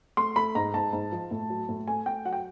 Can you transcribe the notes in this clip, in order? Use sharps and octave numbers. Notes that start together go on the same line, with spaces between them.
A3 C6
A3 B5
G#2 A#5
G#2 A5
G#2
F3
A2
F#3
A2
A3 G#5
A3 G5
F#3 F#5
G5